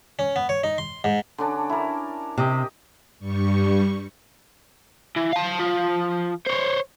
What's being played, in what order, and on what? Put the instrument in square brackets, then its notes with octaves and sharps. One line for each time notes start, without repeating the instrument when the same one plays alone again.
[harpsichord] C#4
B3
C#5
D#4
C6
G#2
[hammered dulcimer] D3 C#4 D4
E4 A#4
[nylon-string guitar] C3 [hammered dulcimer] G4 D#5 G5
[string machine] G2 G3 C#6
[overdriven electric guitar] E3
F5 A5
F3
C5 C#5